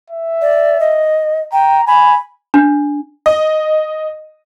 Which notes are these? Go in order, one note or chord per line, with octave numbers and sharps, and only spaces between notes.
E5
D5
D#5
G5 A#5
G#5 B5
D4
D#5